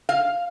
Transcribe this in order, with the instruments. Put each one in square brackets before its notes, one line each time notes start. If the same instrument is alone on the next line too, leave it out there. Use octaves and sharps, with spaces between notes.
[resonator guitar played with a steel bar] F5